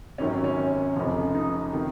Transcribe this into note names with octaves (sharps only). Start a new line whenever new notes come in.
G#1 F#2 D#3 F#3 C#4
C#4
F1 F2 C#3 F3
D#4
C3 D#3